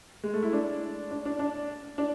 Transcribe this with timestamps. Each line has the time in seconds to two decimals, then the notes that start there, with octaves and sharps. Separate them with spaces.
0.24 G#3
0.34 A3
0.43 E4
0.53 D4
1.11 D4
1.25 D4
1.39 D4
1.98 D4